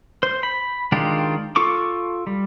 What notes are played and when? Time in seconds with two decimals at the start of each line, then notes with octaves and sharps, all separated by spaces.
0.23 C5
0.43 B5
0.92 D#3 G#3 D4 F4 G4
1.56 F4 A4 C#6 D6
2.27 G3